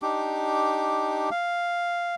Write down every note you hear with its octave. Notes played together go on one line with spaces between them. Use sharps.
D4 D#4 G4 D6
F5